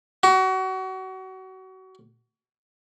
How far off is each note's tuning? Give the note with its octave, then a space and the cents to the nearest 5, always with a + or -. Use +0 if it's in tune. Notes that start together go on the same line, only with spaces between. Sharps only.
F#4 +30